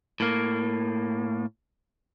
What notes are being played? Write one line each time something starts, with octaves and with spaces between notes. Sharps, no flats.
A2 A#3